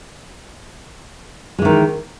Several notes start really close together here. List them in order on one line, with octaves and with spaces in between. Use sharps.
G#3 E3 D#3